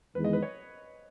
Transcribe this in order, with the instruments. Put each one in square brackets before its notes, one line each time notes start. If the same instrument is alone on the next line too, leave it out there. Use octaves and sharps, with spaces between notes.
[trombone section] E2 D#3 G#3 [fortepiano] B4
[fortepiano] D#5
B4
C#5